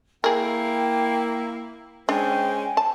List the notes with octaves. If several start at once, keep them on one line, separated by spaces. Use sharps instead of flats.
A#3 E4 G#4 A#4 G5
G#3 C#4 D4 C5 G5 G#5
A5